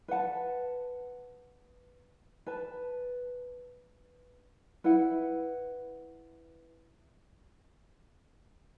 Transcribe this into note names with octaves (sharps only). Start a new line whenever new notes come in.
B4 F#5 A5
B4 A5
E4 B4 F#5